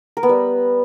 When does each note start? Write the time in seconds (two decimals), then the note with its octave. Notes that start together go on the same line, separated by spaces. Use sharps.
0.17 A#4
0.23 B3
0.29 G3